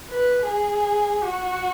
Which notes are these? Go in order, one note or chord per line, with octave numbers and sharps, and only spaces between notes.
B4
G#4
F#4